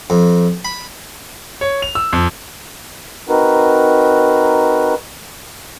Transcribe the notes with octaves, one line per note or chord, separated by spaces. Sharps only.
F2
B5
C#5
F7
E6
F2
C4 D#4 F#4 A#4 B4